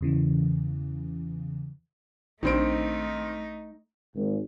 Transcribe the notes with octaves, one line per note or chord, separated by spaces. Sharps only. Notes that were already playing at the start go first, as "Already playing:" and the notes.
E2 C#3 E3
A#1 D#3 A3 C4 D4 D#4 D7
G#1